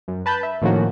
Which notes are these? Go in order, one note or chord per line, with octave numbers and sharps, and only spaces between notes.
F#2
B4 A5 B5 G6
E5
A2 D#3 F3 A#3 C#4 F#4